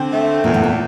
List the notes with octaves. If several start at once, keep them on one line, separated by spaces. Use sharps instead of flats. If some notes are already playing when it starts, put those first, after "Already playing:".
Already playing: D3 C4
A3
E2 A#2
A2
A#2